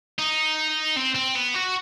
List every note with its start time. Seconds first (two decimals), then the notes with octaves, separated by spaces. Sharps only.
0.18 D#4
0.97 C4
1.15 C4
1.36 B3
1.55 F#4